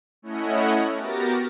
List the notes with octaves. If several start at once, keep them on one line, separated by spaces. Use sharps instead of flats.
A3 C#4 E4 C#5 D#5 F#5
B3 F#4 G4 A#4 A6 A#6